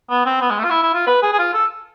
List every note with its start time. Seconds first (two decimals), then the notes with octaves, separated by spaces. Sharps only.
0.10 B3
0.26 C4
0.41 B3
0.50 G#3
0.58 A3
0.64 F4
0.70 E4
0.83 E4
0.94 F4
1.07 B4
1.22 G#4
1.33 G#4
1.39 F4
1.54 A4